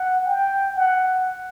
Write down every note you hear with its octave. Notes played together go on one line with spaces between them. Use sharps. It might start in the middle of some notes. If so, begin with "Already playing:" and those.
Already playing: F#5
G5
F#5